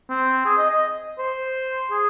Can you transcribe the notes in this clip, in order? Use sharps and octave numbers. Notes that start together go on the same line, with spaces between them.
C4
G#4
D#5
D#5
C5
G#4